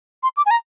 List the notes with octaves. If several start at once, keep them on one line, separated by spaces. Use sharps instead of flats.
C6
D6
G#5
A#5